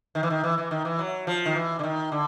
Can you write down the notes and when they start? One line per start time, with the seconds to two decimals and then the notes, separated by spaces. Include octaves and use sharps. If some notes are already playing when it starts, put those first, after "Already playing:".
0.15 D#3
0.23 E3
0.30 D#3
0.44 E3
0.58 E3
0.71 D#3
0.85 E3
0.99 F#3
1.27 F3
1.46 D#3
1.55 E3
1.79 D3
1.83 D#3
2.12 D3